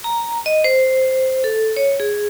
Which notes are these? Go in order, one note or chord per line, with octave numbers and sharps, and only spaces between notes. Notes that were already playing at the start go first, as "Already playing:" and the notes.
A#5
D#5
C5
A4
C#5
G#4